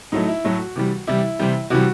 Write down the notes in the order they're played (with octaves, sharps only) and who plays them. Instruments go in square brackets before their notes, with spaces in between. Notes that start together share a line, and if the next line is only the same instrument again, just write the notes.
[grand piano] A2 F#3 A3 D#4
E4
A2 F#3 A3 F#4
C3 E3 G3
C3 E3 G3 E4
C3 E3 G3
C3 E3 G3 F#4